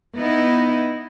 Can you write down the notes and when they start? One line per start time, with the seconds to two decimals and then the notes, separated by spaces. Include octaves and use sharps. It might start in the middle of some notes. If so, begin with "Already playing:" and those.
0.15 B3 D#4 E4 D#5